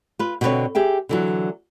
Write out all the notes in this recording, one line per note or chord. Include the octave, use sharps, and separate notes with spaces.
F4 B4
B2 D3 C4 F#4 B4 C#5
G4 G#4 E5 G5
D3 E3 F#3